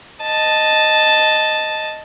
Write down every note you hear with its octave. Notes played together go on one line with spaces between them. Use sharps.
D#5 A5